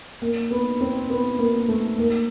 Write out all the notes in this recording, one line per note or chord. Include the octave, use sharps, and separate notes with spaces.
A#3
B3
C4
B3
A#3
A3
A#3